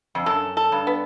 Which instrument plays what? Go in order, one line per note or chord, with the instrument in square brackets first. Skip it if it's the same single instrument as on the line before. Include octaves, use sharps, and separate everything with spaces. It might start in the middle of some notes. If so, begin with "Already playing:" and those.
[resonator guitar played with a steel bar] F2
[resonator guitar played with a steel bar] F#2 [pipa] A4
[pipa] A4
[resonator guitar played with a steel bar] G2
[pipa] B3